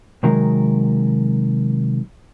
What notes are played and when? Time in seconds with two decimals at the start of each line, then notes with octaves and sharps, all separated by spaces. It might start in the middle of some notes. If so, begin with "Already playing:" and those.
0.23 C3 D#3 F#3 G#3 A#4